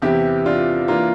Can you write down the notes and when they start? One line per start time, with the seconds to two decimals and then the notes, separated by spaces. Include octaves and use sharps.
0.02 E2 C3 E3 E4 G4
0.46 D4 F4
0.88 E3 A#3 D4 F4